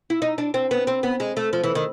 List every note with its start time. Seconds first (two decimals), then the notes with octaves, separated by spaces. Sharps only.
0.10 E4
0.22 D#4
0.38 D4
0.54 C4
0.71 B3
0.87 C4
1.03 B3
1.20 G#3
1.37 A3
1.53 F3
1.64 E3
1.75 D#3